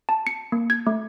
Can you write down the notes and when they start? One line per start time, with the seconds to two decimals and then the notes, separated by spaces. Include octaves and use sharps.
0.09 A5
0.27 C#7
0.52 A#3
0.70 G#6
0.87 A3